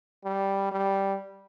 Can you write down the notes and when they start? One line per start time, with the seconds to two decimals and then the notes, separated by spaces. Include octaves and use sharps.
0.24 G3
0.71 G3